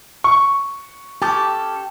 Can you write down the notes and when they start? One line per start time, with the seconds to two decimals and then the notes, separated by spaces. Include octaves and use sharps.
0.24 C#6
1.22 C#4 G4 A4 A5